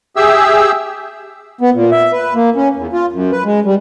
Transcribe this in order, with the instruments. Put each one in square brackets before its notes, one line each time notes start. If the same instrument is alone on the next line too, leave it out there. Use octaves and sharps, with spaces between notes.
[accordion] G4 G#4 E5 E6
[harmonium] B3
A#2
E5
B4
A#3
C#4
E2
F4
F#2
B4
G#3
G3